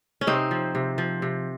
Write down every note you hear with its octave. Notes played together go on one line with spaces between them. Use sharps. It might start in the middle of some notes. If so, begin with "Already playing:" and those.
C#4
C3 C4 D#4
F3
C3
F3
C3